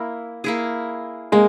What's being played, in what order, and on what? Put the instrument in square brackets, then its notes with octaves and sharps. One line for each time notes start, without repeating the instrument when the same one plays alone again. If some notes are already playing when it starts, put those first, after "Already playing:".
Already playing: [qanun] A#3 E4
A#3 E4 G#4
[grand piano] G#3 [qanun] A#3